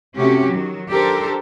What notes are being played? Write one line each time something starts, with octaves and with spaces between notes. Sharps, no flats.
C3 A3 C#4 F#4 G4
D#3 F#3
D4 G4 A4 A#4 C5